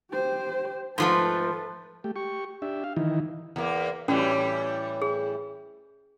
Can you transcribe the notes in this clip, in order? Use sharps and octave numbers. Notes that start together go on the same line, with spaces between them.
G4 C5
G#2 F3 A3 A4 B4
A3 G4
G4 C#6
D4 G4 E5
F5
D#3 E3 D#4 E4
E2 A#3
A2 E3 G3 C#4 F#4 D5
G#4